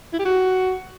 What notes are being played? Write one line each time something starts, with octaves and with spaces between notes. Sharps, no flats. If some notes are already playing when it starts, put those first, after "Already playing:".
E4
G4
F#4